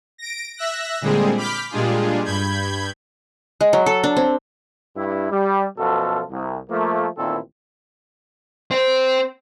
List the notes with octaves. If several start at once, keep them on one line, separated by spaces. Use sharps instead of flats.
A#6 D7
E5 E6 F#6 A#6
A#2 D3 G3 G#3 C4 G#4
B5 D6 F6 G6 B6
A#2 G3 G#3 D4 F4 G#4
G2 B5 G6 G#6
G#3
F#3
A4
D4
C4
G2 E4
G3
F#2 B2 F3 F4 A4
C2
F3 A3 A#3
A1 A#2 D#3 C4 E4 A4
C4 C5